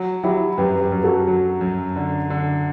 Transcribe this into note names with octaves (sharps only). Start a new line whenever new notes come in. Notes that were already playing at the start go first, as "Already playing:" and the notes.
Already playing: F#3
F#3 E4 G4
F#2 G4 B4
G4 B4
F#2
F#4 A4
F#3
F#2
D3
D3